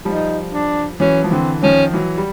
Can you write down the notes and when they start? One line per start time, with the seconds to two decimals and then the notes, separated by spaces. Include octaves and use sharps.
0.05 F3 G3 D#4
0.53 D4
1.00 E3 F#3 C#4
1.24 F3
1.31 D3 E3 C4
1.63 D#3 F3 C#4
1.94 E3 F#3
2.17 G3